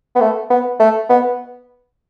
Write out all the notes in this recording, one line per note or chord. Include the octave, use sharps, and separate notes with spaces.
B3
A3
B3
A3
B3